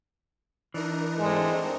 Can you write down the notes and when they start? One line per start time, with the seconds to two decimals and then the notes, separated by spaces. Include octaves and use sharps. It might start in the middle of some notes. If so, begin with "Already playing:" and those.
0.74 E3 D4 D#4 A#4
1.19 G#2 G#3 A3 C4